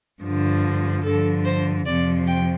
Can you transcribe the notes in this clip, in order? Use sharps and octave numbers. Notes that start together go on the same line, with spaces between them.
G2 D3 F3
G2 D3 F3 A4
C5
F2 C3 F3 D5
G5